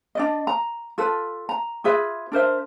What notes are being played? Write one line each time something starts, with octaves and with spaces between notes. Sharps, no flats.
D4 D5 D#5
A#5
F4 A4 B4
A#5
F4 G#4 B4 E5
D4 A#4 C5 E5